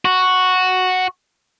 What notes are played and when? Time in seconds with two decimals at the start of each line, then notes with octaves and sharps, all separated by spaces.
0.05 F#4